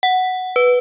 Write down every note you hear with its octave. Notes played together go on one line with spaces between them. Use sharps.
F#5
B4